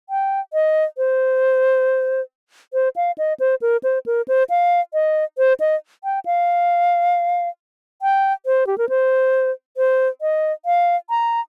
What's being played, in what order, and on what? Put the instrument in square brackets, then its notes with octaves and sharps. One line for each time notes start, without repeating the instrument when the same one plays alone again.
[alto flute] G5
D#5
C5
C5
F5
D#5
C5
A#4
C5
A#4
C5
F5
D#5
C5
D#5
G5
F5
G5
C5
G4
A#4
C5
C5
D#5
F5
A#5